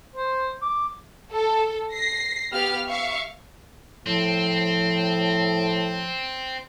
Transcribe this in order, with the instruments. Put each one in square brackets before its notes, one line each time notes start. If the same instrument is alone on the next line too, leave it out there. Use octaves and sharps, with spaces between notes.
[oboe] C5
D6
[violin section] A4
A#6 C7
B3 G4 F5 F6
E5 F5 C#6
[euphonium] A2 [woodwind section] F3 [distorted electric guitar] C4